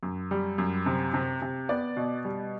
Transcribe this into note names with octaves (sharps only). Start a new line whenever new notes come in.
F#2
G3
F#2
C3
C3
C3
B3 D5
B2
G3